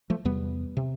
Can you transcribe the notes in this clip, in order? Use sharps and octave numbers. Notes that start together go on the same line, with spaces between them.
F3 A3
E2 C3 G3 B3
C3